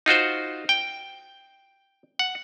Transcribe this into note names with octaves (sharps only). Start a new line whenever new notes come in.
D#4 F4 F#4 C5
G5
F#5